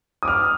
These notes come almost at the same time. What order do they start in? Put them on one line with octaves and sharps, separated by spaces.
D#6 D6 F6